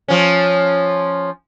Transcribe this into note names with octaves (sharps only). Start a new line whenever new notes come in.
F3 C#4